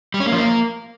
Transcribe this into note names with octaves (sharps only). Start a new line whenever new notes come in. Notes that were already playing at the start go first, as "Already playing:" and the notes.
G3
C#4
A#3
F3
A#3